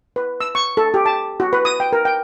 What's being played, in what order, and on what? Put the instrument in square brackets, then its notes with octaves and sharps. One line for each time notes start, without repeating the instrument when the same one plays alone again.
[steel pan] B4
E6
C#6
A4
G4
A5
F#4
B4
D#6
G5
A#4
G5